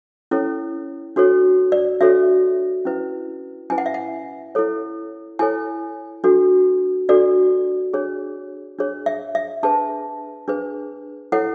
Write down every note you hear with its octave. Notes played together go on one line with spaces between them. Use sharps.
C#4 E4 A4 C#5
D4 F#4 A4 C#5
D5
D4 F#4 A4 C#5 E5
C#4 E4 B4
C#4 E4 B4 G#5
F#5
E5
F#5
E4 A4 C#5
E4 A4 C#5 G#5
D4 F#4 A4
D4 F#4 A4 D5
D4 G#4 C#5
D4 G#4 C#5
E5
E5
D4 G#4 B4 A5
D4 G#4 B4
E4 A4 C#5 F#5